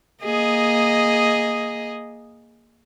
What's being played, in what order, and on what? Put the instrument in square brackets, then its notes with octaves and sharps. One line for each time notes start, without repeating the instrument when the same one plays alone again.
[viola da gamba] A#3 G#4 D#5